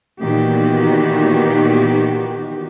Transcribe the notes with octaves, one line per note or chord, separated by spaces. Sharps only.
A#2 D#3 E3 B3 F#4 G4